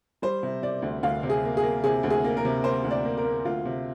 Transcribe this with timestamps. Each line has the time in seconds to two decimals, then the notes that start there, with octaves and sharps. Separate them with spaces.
0.22 G3 C5
0.43 C3
0.62 C3 D5
0.82 D2
1.03 D2 F5
1.23 C3
1.30 G#4
1.44 A#3
1.57 G#4
1.63 A#3
1.84 C3 G#4
2.03 D2
2.10 G#4
2.24 A#3
2.37 A#4
2.45 C3
2.64 A#3 C5
2.84 D2
2.91 D5
3.05 A#3
3.17 A#4
3.25 A#3
3.45 D2 F4
3.65 C3